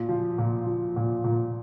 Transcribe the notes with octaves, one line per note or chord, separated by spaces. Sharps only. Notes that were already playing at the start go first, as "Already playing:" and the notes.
Already playing: A#2
F3
A#2
F3
A#2
A#2